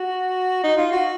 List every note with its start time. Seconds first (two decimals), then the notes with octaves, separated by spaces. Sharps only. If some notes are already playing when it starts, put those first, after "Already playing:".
Already playing: F#4
0.63 D#4
0.77 F4
0.92 F#4